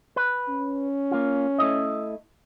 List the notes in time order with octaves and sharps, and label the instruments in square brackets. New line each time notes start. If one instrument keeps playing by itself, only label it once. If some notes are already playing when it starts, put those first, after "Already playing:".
[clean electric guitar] B4
[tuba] C#4
[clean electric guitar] A#3 F4
A3 E4 D#5